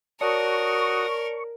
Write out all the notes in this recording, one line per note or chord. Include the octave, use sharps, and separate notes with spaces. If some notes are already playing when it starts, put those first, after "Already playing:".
F#4 A#4 C#5 D5 A5 C#6 D#6